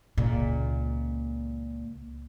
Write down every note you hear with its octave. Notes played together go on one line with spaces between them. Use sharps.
C#2 A#2